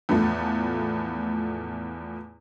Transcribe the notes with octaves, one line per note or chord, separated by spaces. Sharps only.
E2 A2 F3 A3